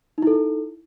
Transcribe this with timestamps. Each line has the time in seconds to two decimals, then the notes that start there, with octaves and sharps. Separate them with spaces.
0.18 D#4
0.22 E4
0.27 A4